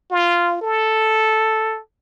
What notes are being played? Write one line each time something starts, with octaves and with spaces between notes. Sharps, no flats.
F4
A4